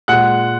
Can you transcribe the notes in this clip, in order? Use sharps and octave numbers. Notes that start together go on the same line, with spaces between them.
A#2 G#3 F#5 F#6